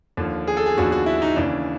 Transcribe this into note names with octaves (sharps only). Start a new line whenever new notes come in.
D#2 D3 F3
G#4
A4
G#4
D#2 D3 F3 F#4
F#4
E4
D#4
D#2 C#3 E3 D4